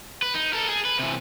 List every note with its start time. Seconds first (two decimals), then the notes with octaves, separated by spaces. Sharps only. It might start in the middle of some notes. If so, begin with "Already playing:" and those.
0.22 B4
0.35 D#4
0.53 A4 A#4
0.69 G#4
0.85 B4
0.99 C3 E3